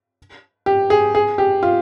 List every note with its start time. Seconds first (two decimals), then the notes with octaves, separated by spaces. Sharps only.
0.66 G4
0.90 G#4
1.15 G#4
1.38 G4
1.63 F4